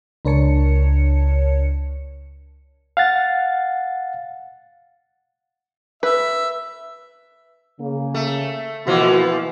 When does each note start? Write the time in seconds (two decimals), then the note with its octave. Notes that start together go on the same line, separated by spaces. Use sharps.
0.25 C#2 D4 A#4 C#5 A5 C#7
2.97 F5 F#5 A6
6.03 B4 E5
7.80 C#3 A#3
8.15 A3
8.87 B2 E3 F3 A#3 E4 F#4